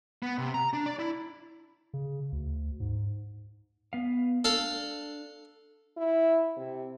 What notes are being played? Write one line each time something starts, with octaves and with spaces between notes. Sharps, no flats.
B3
C3
A#5
D4
D5
E4
C#3
D2
G#2
B3 F5
D4 A4 F5 A5
E4
C3